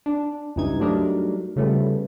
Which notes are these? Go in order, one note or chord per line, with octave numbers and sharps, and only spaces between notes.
D4
C#2 G2 E3 D#4 G#6
F#3 G3 A3 D4 D#4 A#4
C#3 F3 G3 A3 B3